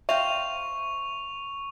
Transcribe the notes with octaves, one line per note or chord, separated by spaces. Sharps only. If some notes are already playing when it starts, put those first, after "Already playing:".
C5 E5 F5 G5 C#6 F7